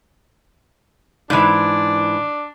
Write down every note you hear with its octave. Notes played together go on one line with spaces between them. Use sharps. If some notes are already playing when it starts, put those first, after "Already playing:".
G#2 E3 D4